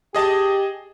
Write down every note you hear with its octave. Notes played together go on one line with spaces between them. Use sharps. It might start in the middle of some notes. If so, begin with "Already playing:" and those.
G4 G#4 D#5 A5